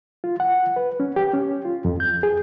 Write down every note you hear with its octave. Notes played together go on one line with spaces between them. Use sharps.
F4
F#5
B4
C#4
G4
C#4
F4
F2
G6
G#4